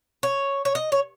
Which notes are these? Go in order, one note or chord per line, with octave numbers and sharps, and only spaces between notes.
C#5
C#5
D#5
C#5